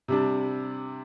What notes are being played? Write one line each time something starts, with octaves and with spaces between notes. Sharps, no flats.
C3 G3 D4